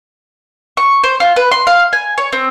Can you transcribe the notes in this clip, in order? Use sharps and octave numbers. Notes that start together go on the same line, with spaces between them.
C#6
C5
F4
B4
C6
F5
G#5
C#5
C4